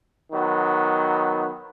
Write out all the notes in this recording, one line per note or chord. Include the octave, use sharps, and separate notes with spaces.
D#3 F#3 B3